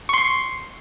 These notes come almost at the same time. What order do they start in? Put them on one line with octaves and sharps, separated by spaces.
C#6 C6 C7